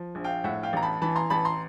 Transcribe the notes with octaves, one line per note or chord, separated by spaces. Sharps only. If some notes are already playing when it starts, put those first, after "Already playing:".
Already playing: F3
A#1
F5 G5
A2 E5 F#5
F5 G5
A1 A#5
A5 B5
E3 A5 B5
A#5 C6
A1 A5 B5
A#5 C6